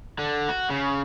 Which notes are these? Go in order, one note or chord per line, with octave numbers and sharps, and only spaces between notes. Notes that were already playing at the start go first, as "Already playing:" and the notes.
D3
F#4
C#3